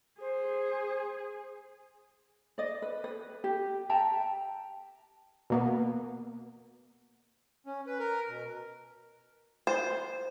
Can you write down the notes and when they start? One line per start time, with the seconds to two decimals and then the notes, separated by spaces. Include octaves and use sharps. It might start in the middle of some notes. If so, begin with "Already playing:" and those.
0.20 G#4 C5
2.58 D5 D#5
2.82 B4
3.04 B4
3.44 G4
3.89 E5 G5 A5 A#5
5.50 B2 A#3 B3
7.66 C#4
7.87 B4
7.99 A#4
8.29 B2
9.67 C5